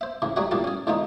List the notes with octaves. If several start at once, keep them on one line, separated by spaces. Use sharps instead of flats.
C5 E5
A2 C#3 E3
F#3 G3 A3 F#4 G#4 E5
E2 A#2 G3 F#4 A5 C6
C#4 G#4
E2 D3 F3 G#3 A3 D#4